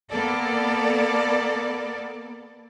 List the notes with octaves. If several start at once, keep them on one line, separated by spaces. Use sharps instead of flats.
A#3 B3 A4 D5